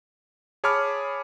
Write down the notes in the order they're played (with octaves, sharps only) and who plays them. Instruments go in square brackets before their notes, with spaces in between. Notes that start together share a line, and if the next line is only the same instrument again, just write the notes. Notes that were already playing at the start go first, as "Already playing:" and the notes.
[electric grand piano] G#4 C#5 A5 B5 D6 F6